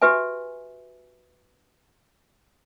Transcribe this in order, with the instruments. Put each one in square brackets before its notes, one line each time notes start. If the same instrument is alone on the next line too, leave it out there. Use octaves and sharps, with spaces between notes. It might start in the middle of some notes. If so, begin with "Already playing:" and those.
[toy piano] F#4 G4 B4 E5 G#5